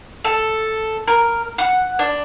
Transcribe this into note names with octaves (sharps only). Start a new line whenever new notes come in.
A4
A#4
F#5
D4